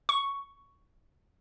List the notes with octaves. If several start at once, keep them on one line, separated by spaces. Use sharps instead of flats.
C#6